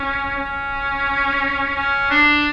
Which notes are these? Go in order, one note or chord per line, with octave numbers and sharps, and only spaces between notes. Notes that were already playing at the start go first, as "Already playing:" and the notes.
Already playing: C#4
C#4
C#4
D4